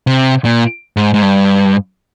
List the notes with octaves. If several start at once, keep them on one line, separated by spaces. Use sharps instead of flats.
C3
A#2
G#2
G#2
G2